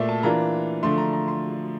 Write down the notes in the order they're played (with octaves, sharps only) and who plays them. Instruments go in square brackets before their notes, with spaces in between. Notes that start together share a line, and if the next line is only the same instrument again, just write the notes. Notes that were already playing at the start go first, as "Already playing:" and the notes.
Already playing: [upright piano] A#2 A3 D5 E5
A5
E3 A#3 D4 F4 A#5
D3 F3 A3 C6
A#5
A#5
C6